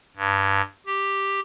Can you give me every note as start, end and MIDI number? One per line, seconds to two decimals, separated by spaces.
0.17 0.61 43
0.86 1.40 67